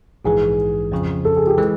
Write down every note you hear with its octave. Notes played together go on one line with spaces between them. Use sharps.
A#1 G#2 E3 G#4
F2 C#3 F3
A4
G#4
G4
E3 G#3